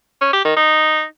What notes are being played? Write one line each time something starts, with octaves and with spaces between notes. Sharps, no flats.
C#4
G4
D#3
D#4